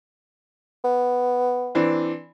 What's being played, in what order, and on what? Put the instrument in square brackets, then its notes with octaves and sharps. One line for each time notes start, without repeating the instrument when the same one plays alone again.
[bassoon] B3
[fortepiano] E3 C4 D4